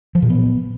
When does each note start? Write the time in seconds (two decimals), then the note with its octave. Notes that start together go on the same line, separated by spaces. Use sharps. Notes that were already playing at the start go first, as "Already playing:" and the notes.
0.15 F3
0.22 A#2
0.30 B3